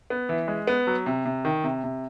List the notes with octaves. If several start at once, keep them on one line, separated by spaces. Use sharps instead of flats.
B3
E3
G#3
B3
F#3
C3
C3
D#3
C3
C3